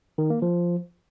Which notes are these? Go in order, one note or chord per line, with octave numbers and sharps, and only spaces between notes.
D#3
A#3
F3